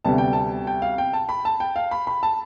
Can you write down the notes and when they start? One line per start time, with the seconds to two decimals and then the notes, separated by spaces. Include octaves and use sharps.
0.05 D2 C3 G3 B3 A5
0.18 G5
0.33 A5
0.67 G5
0.82 F5
0.98 G5
1.13 A5
1.29 B5
1.45 A5
1.60 G5
1.76 F5
1.91 B5
2.07 B5
2.23 A5